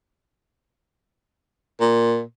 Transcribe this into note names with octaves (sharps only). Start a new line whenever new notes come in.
A#2